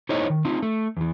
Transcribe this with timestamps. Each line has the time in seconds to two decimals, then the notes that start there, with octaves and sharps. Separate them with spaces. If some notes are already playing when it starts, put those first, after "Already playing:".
0.09 D#4 E4 A4 C5 C#5 D#5
0.30 D#3
0.45 C4 D#4 F4
0.62 A3
0.97 E2 E3